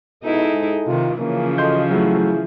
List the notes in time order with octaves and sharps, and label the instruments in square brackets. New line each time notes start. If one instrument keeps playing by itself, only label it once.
[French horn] B2 [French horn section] G#3 G#4 A4 [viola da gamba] D#4 E4
[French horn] G#2
[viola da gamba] C3 D#3 [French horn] F4
[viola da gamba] C#3 E3 F3 [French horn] A#3 [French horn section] C#4
[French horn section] F#4 A4 [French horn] D#5 [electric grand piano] C6 G6
[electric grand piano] F#3 A3 [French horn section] E4 [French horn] G#4